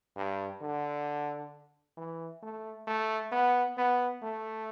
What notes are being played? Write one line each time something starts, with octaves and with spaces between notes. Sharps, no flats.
G2
D3
E3
A3
A3
B3
B3
A3